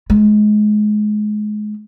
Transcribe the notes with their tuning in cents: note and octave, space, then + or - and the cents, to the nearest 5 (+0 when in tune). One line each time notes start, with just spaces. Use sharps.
G#3 +25